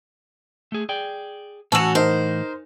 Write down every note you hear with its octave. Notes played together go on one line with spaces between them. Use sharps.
A3 G#4
G#4 D5 G5
A2 E3 C#4 F#4 F#5 A5 E6 E7
D#4 A#4 C5